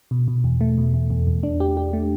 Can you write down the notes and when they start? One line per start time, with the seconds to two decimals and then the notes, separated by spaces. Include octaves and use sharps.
0.11 B2
0.28 B2
0.44 E2
0.61 A3
0.78 B2
0.94 E2
1.10 E2
1.27 E2
1.43 D4
1.60 G4
1.77 G4
1.93 A3